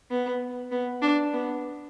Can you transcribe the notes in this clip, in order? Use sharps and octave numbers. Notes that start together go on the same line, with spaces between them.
B3
B3
D4
B3